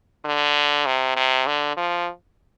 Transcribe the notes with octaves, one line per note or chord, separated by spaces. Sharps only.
D3
C3
C3
D3
F3